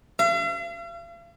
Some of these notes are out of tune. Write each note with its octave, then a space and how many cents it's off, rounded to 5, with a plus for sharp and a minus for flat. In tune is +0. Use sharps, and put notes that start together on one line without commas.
F5 -45